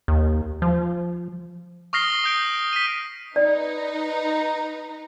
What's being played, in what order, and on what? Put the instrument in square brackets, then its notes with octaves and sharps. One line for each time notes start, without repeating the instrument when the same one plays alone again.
[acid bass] D#2
F3
[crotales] C#6 D#6 F6 A#6 C7 G7
D#6 G6 D7
B6 D#7
[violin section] D#4 B4 A#5 [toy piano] D5